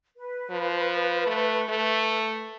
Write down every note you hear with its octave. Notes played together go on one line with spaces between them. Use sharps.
B4
F3
A3
A3